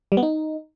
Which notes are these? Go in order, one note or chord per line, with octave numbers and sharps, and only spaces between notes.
G3
B3
D#4